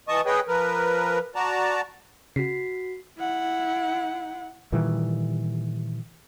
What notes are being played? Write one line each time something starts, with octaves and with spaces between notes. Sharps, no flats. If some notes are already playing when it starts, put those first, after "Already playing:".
E3 D#5 A5 C#6 D#6
G#4 B4 C#5 D#5 G5
F3 A#4 B4
F#4 D5 A5 A#5
C#3 F#4 B6 C7
E4 F#5
A#2 D#3 E3 G3